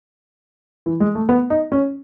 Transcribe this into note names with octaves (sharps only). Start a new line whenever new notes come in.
E3
G#3
A3
B3
D#4
C#4